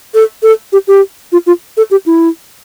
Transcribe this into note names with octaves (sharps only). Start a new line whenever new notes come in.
A4
A4
G4
G4
F4
F4
A4
G4
E4